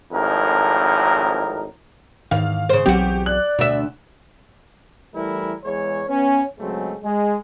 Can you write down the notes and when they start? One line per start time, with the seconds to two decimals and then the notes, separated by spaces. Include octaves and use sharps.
0.12 G#1 F2 A2 D#4 A#4
2.31 E2 G#2 D#3 F5
2.69 C#3 C5
2.86 B1 E2 F#3 C4 F#4 G4
3.26 D5 F#6 F#7
3.59 D2 B2 E5
5.15 E3 G3 A3 E4 A#4
5.65 E2 G#3 C#5
6.09 B3 C#4
6.60 C#2 F#3 G#3 A3 C4
7.03 G#3